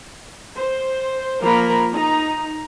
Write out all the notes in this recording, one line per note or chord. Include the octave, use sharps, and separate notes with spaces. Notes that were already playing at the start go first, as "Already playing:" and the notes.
C5
F3 A#3 F4 A#4 A#5 B5
D#4 A#5